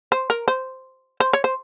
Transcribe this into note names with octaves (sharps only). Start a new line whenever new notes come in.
C5
A#4
C5
C5
C#5
C5